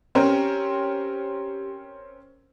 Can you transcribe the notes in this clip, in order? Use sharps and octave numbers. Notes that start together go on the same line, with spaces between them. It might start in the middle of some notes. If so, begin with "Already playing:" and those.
C4 C#4 G4 A#4